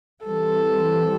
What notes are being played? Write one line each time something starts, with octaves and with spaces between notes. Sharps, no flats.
E3 G3 C4 A4